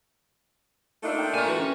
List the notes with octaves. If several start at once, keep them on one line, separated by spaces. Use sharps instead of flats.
A3 A#3 D4 D#4 F4 E5
G5 A5
A#2 A#4 C#5 D5 G#5 A5
E3 F#4
C#4